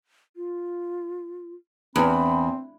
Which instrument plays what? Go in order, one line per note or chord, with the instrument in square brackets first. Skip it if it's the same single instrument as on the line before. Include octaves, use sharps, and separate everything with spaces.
[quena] F4
[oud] E2 [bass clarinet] C4 [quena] B5